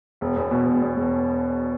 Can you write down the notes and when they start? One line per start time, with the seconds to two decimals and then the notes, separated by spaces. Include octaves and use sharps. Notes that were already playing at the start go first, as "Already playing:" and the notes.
0.21 E1
0.36 E2
0.51 B2
0.65 E1
0.81 E2
0.96 E1